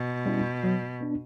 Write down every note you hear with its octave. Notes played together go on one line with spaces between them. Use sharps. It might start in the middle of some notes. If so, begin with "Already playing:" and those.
Already playing: B2
G3 C#4 E4
F#3
B3 D4